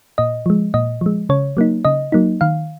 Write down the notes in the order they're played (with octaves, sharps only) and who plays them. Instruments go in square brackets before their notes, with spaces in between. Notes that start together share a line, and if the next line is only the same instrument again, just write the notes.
[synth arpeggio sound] A#2 D#5
F3 G#3
A#2 D#5
F3 G#3
C#3 C#5
F#3 A#3 D#4
C#3 D#5
F#3 A#3 D#4
D#3 F5